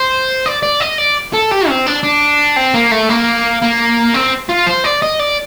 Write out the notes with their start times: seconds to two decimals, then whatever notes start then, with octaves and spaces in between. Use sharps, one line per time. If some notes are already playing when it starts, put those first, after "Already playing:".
Already playing: C5
0.46 D5
0.63 D5
0.81 D#5
0.98 D5
1.33 A4
1.51 G4
1.68 C4
1.86 D4
2.03 D4
2.56 C4
2.74 A#3
2.92 A3
3.09 A#3
3.62 A#3
4.14 C4
4.49 F4
4.67 C5
4.85 D5
5.02 D#5
5.19 D5